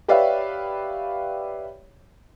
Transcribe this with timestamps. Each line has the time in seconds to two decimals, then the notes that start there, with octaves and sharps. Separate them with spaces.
0.08 G4 B4 C#5 D5 E5 F5